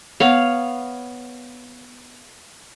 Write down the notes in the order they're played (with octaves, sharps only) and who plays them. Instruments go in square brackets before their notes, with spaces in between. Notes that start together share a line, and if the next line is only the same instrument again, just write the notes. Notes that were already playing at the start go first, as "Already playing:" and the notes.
[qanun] B3 C#5 F5